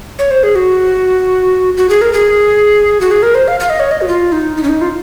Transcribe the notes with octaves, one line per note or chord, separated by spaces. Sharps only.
C#5
C5
G#4
F#4
F#4
G#4
A#4
G#4
F#4
G#4
A#4
C5
F5
F5
D#5
C#5
D#5
F#4
F4
D#4
D#4
C#4
D#4
F4